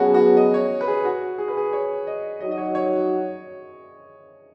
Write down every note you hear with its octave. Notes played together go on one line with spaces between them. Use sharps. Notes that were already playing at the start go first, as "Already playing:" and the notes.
Already playing: B2 F#3 B3 C#4 F#4 G#4
F#4
D#5
C#5
B4
G#4
F#4
G#4
B4
G#4
C#5
D#5
F#3 D#4 F#4 D#5
D#5
C#5
C#5